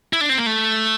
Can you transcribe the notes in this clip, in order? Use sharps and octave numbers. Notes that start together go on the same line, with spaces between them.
E4
D4
C4
A#3
A3